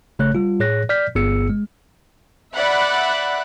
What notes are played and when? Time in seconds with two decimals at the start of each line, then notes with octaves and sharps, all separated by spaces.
0.19 A1 C#3 A3 C#5 F#6
0.35 G3 F4
0.60 A2 G#4 C#5 F#6 A#6
0.89 D5 F6 G6 B6
1.15 G1 G2 B3 G#4 E6 C#7
1.50 G#3
2.55 D5 E5 F#5 B5 F#6